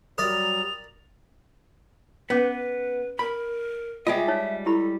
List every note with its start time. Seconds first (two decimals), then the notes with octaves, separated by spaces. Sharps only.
0.18 F#3 G3 A#4 D5 D#6 F7
2.30 B3 C#4 B4 D6
3.19 A#4 B5
4.07 G3 G#3 F4 D#5 E5 G#5
4.28 D#4 C#5
4.66 E4 G4 A4 B5